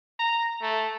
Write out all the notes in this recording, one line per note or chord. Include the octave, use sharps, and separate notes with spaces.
A#5
A3